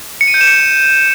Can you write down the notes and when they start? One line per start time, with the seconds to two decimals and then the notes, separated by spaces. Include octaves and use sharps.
0.21 C#7
0.27 D#7
0.34 G6
0.41 E7
0.47 C#7